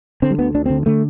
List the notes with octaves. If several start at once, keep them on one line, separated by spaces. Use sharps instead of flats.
D3 C4
G3
D2 B3
D2 D4
D3 C4
D3 A3